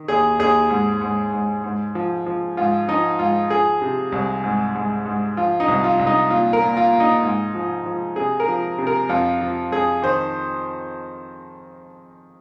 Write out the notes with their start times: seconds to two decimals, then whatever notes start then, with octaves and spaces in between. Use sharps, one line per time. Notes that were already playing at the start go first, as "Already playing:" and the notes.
Already playing: D#3
0.08 D#2 G#4
0.40 D#2 G#4
0.70 G#2
1.01 G#2
1.33 G#2
1.64 G#2
1.95 F3
2.26 F3
2.57 G#2 F4
2.88 F3 D#4
3.19 G#2 F4
3.50 F3 G#4
3.82 C3
4.12 C2
4.44 G#2
4.75 G#2
5.05 G#2
5.37 F3 F4
5.60 D#4
5.68 C2
5.84 F4
5.99 C2
6.07 D#4
6.30 A#2 F4
6.53 A#4
6.61 A#2
6.77 F4
6.93 A#2
7.00 D#4
7.23 G#2
7.55 F3
7.86 F3
8.16 C3 G#4
8.40 A#4
8.48 F3
8.78 C3
8.87 A#4
9.09 F2 F4
9.41 F3
9.72 F2 G#4
10.02 D#3 C5